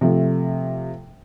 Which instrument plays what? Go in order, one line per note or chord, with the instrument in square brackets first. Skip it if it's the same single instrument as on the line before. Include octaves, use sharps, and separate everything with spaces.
[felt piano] C3 F3 A3